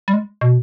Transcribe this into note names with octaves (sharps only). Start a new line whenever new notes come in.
G3
G#3
B2